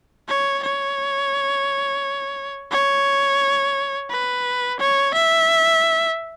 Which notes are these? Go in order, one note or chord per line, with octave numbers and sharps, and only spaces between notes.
C#5
C#5
C#5
B4
C#5
E5